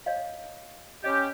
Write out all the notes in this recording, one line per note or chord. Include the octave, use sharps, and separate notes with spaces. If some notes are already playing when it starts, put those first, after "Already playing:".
C#5 D#5 F5
C#4 G4 D#5 B5